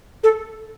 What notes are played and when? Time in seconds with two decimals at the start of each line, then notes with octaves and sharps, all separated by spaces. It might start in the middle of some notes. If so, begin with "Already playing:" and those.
0.23 A4